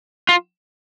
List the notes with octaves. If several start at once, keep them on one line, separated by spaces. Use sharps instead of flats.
F4